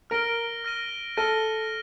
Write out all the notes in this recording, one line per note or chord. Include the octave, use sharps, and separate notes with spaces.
A#4 F6 A#6 D7 G7
F6 A#6 D#7 G7
A4 F6 A#6 D#7 G7